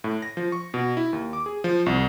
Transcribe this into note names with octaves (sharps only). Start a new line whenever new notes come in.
A2
A#6
F3
C#6
B2
E4
D#2
D6
G#4
F3
C2